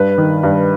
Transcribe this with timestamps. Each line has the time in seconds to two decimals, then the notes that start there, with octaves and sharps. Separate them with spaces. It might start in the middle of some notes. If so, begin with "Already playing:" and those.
Already playing: G2 B4
0.18 D#3
0.43 G2